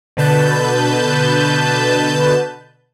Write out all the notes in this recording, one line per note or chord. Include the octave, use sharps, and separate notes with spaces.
B2 D3 B4 A5 G6